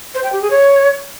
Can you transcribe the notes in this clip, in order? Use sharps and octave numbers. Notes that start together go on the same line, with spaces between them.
C5
G5
G4
G#4
C#5